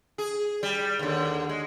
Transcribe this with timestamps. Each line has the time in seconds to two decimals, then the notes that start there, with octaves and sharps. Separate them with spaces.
0.18 G#4
0.63 G3
0.99 D#2 D3
1.49 G#3